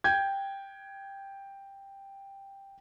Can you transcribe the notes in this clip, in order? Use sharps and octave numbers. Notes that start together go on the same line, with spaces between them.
G5 G6 G#6